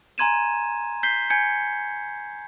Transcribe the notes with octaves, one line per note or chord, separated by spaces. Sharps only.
G#5 A#5 C6 G#6 D#7 E7
G6 B6 C7 G7
G#5 G6 G#6 C#7